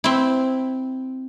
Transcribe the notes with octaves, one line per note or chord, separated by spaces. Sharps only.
C4 E4